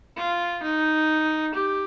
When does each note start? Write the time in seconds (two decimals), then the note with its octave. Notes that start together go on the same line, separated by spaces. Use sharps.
0.17 F4
0.63 D#4
1.55 G4